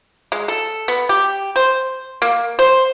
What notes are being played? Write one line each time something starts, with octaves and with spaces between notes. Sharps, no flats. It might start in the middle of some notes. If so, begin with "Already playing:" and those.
G#3
A4
B3
G4
C5
A#3
C5